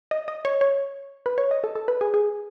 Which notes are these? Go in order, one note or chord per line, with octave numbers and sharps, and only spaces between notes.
D#5
D#5
C#5
C#5
B4
C#5
D#5
A4
A4
B4
G#4
G#4